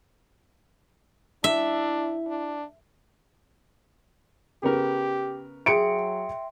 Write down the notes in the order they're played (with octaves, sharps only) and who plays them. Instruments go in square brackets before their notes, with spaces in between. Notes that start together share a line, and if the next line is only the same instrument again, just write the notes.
[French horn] D4 [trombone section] E4 [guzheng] E5
[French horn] D4
[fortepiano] C#3 B3 A#4 [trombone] G4
[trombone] F#3 [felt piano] G#4 C#7 D7 [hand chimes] E5 G5 C6